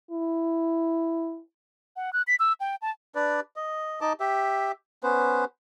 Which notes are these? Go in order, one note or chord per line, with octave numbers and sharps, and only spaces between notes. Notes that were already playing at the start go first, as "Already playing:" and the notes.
E4
F#5
F#6
B6
E6
G5
A5
D4 B4 D5
D#5
D#4 D#5 A5 D6
G4 E5
B3 C#4 B4 C5